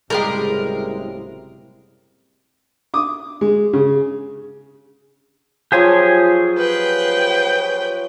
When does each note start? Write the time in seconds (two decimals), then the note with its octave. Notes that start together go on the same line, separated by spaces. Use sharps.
0.10 F#1 A2 C3 G3 G#3 G4 A#4
2.94 D6 D#6
3.41 G#3
3.73 C#3
5.72 F3 F#3 F4 G4 G#4 G#5
6.58 B4 G5